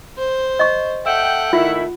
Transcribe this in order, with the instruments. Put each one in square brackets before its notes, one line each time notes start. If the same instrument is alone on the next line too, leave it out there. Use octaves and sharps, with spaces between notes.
[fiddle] C5
[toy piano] D#5 C#6
[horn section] A4 E5 G5 [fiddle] F#5
[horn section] D#3 A3 E4 [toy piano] F4